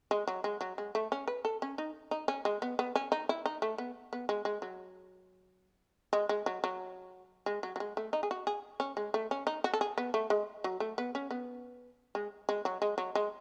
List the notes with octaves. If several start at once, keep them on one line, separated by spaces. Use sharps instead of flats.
G#3
F#3
G#3
F#3
G#3
A3
C#4
B4
A4
C#4
D#4
D#4
C#4
G#3
B3
B3
C#4
D#4
E4
D#4
A3
B3
B3
G#3
G#3
F#3
G#3
G#3
F#3
F#3
G#3
F#3
F#3
G#3
A3
D#4
G#4
F#4
G#4
C#4
G#3
A3
C#4
D#4
F#4
A4
G#4
B3
A3
G#3
F#3
A3
B3
C#4
B3
G#3
G#3
F#3
G#3
F#3
G#3